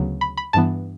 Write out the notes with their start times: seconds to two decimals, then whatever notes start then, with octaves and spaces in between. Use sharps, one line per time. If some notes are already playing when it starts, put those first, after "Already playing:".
Already playing: D2 C#3 F#3 B3
0.21 B5
0.37 B5
0.53 G2 E3 B3 A5